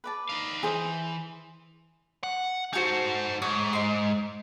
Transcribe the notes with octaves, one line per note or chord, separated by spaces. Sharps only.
B4 D5 A5
D#4 F5
E3 G#4 C5
F#5
D#4 F#4 A4 C5 G#5
G#2 C#5
D#4 C6